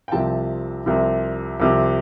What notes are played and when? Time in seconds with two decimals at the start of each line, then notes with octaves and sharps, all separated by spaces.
0.08 G5
0.12 C2 C3 F3 A5
0.86 C2 C3 F3
1.60 C2 C3 F3